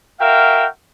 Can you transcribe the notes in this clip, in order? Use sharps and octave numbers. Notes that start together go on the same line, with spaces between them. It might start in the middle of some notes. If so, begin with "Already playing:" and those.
F#4 A#4 E5 F5 G5